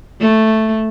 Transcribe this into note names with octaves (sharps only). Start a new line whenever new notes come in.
A3